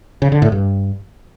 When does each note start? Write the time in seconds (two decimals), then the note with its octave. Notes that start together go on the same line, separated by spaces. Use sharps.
0.22 C#3
0.32 D3
0.42 A2
0.52 G2